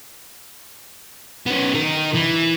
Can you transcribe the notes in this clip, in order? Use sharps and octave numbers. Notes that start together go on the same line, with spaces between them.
B3 C#4
D#4 A#4
E3